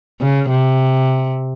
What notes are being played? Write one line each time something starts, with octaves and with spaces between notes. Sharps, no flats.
C#3
C3